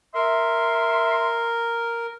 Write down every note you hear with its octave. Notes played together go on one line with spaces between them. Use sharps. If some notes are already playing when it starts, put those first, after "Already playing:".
A#4 E5 C6